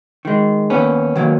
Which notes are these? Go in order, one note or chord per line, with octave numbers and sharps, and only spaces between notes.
D#3 G#3
D#2 B3 C#4
D#3 F#3 A#3